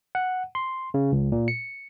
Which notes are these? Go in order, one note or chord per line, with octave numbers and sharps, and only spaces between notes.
F#5
C6
C#3
C#2
A#2
C#7